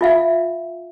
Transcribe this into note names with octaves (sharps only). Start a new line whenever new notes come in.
F4 E5 F5